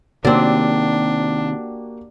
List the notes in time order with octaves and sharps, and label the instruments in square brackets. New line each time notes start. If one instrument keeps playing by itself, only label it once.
[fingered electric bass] C3 D#3 [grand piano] A#3 F#4 G4 [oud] C4 D5 [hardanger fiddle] D4